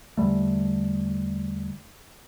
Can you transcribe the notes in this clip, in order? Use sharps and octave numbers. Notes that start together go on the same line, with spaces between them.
E2 D3 G3 A3